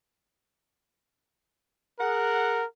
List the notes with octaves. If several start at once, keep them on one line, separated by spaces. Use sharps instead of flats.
G#4 A#4 F#5